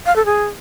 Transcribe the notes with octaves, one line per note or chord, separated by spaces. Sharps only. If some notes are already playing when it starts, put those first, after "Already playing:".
F5
A4
G#4